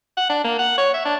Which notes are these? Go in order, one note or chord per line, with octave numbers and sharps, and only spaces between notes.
F#5
D4
A#3
F#5
C#5
E5
D4